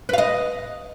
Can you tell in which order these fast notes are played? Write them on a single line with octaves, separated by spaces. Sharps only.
B4 F5 D#5